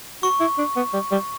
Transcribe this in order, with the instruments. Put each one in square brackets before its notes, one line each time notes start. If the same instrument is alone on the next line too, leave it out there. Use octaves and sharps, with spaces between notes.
[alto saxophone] F#4 [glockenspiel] C#6
[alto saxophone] E4
D4
B3
G3
G3